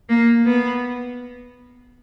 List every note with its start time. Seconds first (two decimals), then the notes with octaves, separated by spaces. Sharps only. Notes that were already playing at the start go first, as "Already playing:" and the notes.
0.09 A#3
0.45 B3